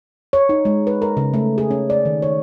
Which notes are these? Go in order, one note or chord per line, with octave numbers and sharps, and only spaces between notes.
C#5
D#4
G#3
B4
A#4
C#3
A3
G#4
C#4
D5
D#3
C#5